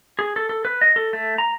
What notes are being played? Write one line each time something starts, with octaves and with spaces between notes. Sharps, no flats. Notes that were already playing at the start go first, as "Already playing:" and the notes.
G#4
A4
A4
B4
D#5
A4
A3
A#5